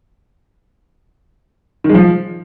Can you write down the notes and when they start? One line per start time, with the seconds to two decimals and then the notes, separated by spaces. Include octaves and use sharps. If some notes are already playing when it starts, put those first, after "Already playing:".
1.84 D#3
1.89 G#3
1.94 F3